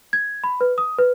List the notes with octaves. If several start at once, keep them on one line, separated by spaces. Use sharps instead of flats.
G#6
B5
B4
D#6
B4